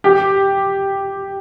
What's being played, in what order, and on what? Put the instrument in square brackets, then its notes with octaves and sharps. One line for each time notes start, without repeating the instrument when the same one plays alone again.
[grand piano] G4